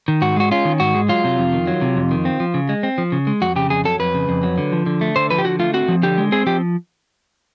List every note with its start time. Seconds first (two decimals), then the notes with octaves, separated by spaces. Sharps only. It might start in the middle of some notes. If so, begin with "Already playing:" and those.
0.08 D#3
0.22 G#2 F#4
0.37 G#3 F#4
0.51 C#4 F4
0.65 D#3
0.80 G#2 F#4
0.95 G#3
1.09 F#3 F4
1.24 C3
1.38 F2
1.53 D#3
1.67 F#3
1.82 C3
1.96 F2
2.11 D#3
2.25 C4
2.40 F3
2.54 C#3
2.69 G#3
2.83 C4
2.98 F3
3.12 C#3
3.27 G#3
3.42 F2 F#4
3.56 C#3 G4
3.70 F2 G#4
3.85 F#3 A4
3.99 F2 B4
4.14 C#3
4.29 F2
4.43 F#3
4.58 D3
4.72 F3
4.86 D3
5.01 A3
5.16 D3 C5
5.30 F3 B4
5.38 G4
5.45 D3 F#4
5.60 A3 F4
5.74 C4 F#4
5.88 F3
6.03 D3 G4
6.18 G#3
6.32 C4 G#4
6.46 F3 G4